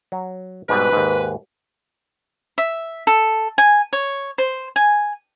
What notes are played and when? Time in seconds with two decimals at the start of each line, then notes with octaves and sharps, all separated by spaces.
0.12 F#3
0.69 G#2 B2 G3 B4
0.92 D#2 G#2
2.58 E5
3.07 A4
3.58 G#5
3.93 C#5
4.38 C5
4.76 G#5